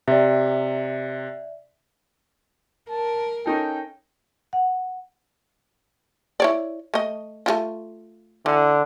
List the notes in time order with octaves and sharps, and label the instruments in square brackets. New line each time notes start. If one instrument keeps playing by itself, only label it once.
[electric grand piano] C3 [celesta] D5 E5
[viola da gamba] A#4 [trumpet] A5
[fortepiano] C#4 D#4 A4 [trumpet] G5
[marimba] F#5
[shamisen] E4 C#5 D5
A3 D#5
A3 E4 F4
[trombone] D3 [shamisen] E3